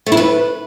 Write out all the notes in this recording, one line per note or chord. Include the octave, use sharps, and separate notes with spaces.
A3
E4
B4